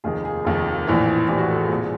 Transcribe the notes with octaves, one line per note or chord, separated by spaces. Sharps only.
F1 D#2 D#3 G#4
G#4
F1 D#2 D#3
A#1 A2 E3
A#1 A2 E3 G4
F#4
A4
G#4
C2 A#2